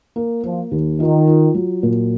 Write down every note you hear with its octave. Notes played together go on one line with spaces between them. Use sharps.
A#3
F3 A#3
D#2
D#3 F4
F4
F#3
A#2